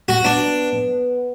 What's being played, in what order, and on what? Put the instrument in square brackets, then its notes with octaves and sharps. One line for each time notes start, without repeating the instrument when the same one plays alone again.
[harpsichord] F#4
[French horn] B3 [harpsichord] D4